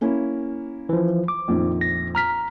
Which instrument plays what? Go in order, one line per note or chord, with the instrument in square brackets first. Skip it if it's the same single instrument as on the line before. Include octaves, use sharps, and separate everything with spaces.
[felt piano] A#3 C#4 E4
[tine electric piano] E3 F3
D6
[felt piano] A#1 F2 D#3
[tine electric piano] A#6
A#5 F6 B6